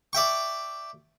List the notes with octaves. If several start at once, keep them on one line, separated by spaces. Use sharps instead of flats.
D5 E5 G5 C#6